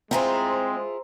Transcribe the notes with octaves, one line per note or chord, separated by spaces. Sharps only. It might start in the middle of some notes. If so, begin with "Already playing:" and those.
G#3 C4 E4 F4 G#4 C5 A#5